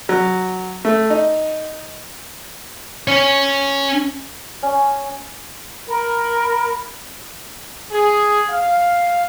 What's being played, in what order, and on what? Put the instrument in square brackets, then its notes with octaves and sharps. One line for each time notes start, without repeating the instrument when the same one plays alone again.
[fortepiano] F#3
A3
D#4
[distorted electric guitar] C#4 C#5
[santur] C#4
[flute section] A#4 B5
[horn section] G#4
F5